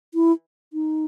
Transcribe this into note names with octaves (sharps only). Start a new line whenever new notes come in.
E4
D#4